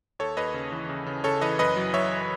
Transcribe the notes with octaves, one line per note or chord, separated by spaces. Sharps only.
D#2 A4 C#5
D#2 B4 D#5
C#3
E3
C#3
C#3
C#3 A4 C#5
E3 B4 D#5
F#2 B4 D#5
F#3
F#3 C#5 E5